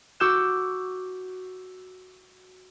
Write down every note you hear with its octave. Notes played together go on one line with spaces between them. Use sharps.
F#4 C#6 D6 E6 G6 E7